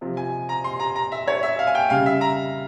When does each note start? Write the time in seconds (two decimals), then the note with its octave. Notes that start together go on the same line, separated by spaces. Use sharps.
0.01 C3 F3
0.17 G#5
0.49 A#5
0.64 C6
0.80 A#5
0.96 A#5
1.12 E5
1.28 C#5
1.43 E5
1.59 F5
1.67 G#5
1.75 G5
1.90 C#3 G3 F5
2.06 E5
2.21 A#5